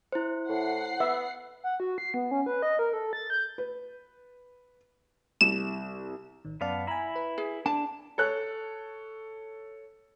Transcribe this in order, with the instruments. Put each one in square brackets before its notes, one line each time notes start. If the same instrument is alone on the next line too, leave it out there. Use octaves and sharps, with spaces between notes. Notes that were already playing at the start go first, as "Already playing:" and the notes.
[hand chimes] E4 C5
[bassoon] A2 [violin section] F#5 C7
[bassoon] B3 [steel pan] E5
[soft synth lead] F#5
F#4
C7
B3
C#4
B4
D#5
A#4
A4
A6
G6
[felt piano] B4
[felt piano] C2 [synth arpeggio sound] E7
[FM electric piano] A1 D#3
[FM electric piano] F#2 D5 A5 [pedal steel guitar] B3 F5
[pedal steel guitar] E4 B5 [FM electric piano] G#5 A#5
[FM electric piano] B4
[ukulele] G#4
[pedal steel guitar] D4 [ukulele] A5
[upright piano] A4 C#5 F#6